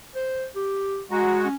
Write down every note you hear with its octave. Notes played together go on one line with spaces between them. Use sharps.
C5
G4
G#3 F#4 A#5
C#4